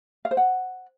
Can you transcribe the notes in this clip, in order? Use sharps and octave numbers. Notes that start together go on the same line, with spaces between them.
F5
C5
F#5